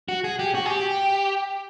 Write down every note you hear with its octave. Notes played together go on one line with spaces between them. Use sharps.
F#4
G#4
G4
F#4
G#4
G4